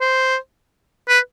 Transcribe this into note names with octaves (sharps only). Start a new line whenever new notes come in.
C5
B4